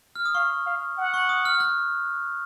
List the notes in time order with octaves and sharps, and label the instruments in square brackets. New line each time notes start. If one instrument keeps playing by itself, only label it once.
[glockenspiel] F6
D#6
[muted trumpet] F5 [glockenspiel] C#6
[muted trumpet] F5
F#5
[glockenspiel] C#6
D#6
F6
F#6